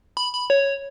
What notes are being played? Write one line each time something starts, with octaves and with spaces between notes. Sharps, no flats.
B5
B5
C#5